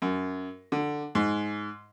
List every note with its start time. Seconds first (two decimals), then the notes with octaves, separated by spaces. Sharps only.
0.02 F#2
0.72 D3
1.15 G#2